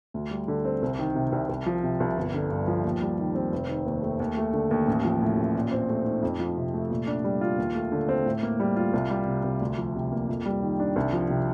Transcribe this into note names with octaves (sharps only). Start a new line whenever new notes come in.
D2
G3
D3
C4
C2
D#3
C3
C2
C2
F3
C3
C2
G1
D3
G2
F3
D#2
G3
D#3
C4
F1
D#3
D#2
A3
D#2
A3
D3
D#2
A1
F3
A2
A1
A#2
C4
A3
D#4
F2
F3
C3
A3
A#2
D4
G3
F4
D#2
A3
D3
C4
A2
A#3
G3
F4
C2
G3
C3
C2
D2
F3
C3
A#3
F2
G3
D#3
D4
C2
F3
C3